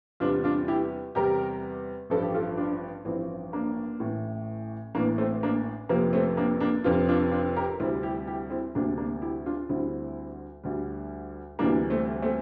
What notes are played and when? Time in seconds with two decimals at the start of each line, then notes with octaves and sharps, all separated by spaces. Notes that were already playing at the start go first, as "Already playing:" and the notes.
0.20 E2 C3 G3 D4 F4
0.44 D4 F4
0.68 E4 G4
1.15 E2 C3 G3 G4 A#4
2.10 A1 G2 F3 A4
2.22 G4
2.34 F4 A4
2.57 D4 F4
3.05 A1 G2 F3 C4 E4
3.53 A#3 D4
4.00 A1 A2 E3
4.95 A1 A2 E3 A#3 D4
5.18 A3 C4
5.43 A#3 D4
5.89 F1 F2 C3 F3 A#3
6.13 A3 C4
6.37 A#3 D4
6.60 A#3 D4
6.84 F1 F2 C3 F3 D4 F4
7.09 D4 F4
7.32 D4 F4
7.56 G4 A#4
7.80 D2 C3 G3 C4 E4
8.03 E4 G4
8.27 E4 G4
8.50 C4 E4
8.74 D2 C3 G3 A#3 D4
8.98 A#3 D4
9.22 E4 G4
9.46 D4 F4
9.69 D2 D3 G3 C4 E4
10.64 D2 D3 G3
11.59 D2 C3 E3 G3 A#3 D4
11.90 A3 C4
12.22 A3 C4